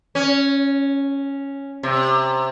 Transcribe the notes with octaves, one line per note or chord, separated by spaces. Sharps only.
C#4
C3